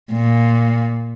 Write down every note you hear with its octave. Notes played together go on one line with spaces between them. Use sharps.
A#2